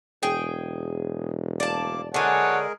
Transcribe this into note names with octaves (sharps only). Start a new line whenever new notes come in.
E1 G#4 G5
D2 A#3 D5 A5 D6
D3 G#3 G#4 A#4 C#5 F#5 G#5 A5